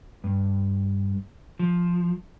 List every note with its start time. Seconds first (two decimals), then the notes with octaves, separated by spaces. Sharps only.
0.24 G2
1.59 F3